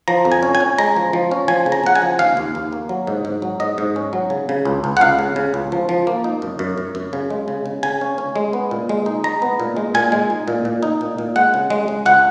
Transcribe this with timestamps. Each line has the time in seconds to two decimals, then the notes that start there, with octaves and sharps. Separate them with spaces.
0.08 F3 A#5
0.25 F2
0.32 G#5
0.43 C#4
0.55 G#5
0.60 C#4
0.79 G#3 A#5
0.96 F3
1.13 F3
1.31 C#4
1.48 F3 G#5
1.66 C#3
1.72 A#5
1.84 C#3 F#5
1.96 G#5
2.02 F3
2.19 D#2 F5
2.37 D#2
2.55 D#2
2.73 A#3
2.89 F#3
3.07 G#2
3.25 G#2
3.42 F#3
3.60 G#2 D#5
3.78 G#2
3.96 C#4
4.13 F#3
4.30 C#3
4.49 C#3
4.65 C#2
4.84 C#2
4.97 F#5
5.01 C#2 F5
5.19 C#3
5.36 C#3
5.54 C#2
5.72 F3
5.89 F3
6.07 A#3
6.24 D#4
6.42 F#2
6.59 F#2
6.78 F#2
6.95 F#2
7.13 C#3
7.30 G#3
7.48 C#3
7.66 C#3
7.83 C#3 G#5
8.01 C#4
8.18 C#4
8.36 G#3
8.53 B3
8.71 A#2
8.89 G#3
9.06 D#4
9.24 G#3 A#5
9.42 B3
9.60 A#2
9.77 G#3
9.94 A#2 G#5
10.12 G#3
10.30 D#4
10.48 A#2
10.65 A#2
10.83 D#4
11.01 A#2
11.18 A#2
11.36 G#3 F#5
11.54 C#3
11.70 G#3
11.88 G#3
12.06 C#2 F#5